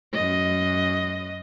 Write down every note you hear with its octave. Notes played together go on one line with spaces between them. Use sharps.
F#2 D#5